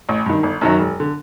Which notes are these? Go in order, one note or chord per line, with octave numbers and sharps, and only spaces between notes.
A1
G2 D#3
G1
F#2 D#3 F#3
E1
D3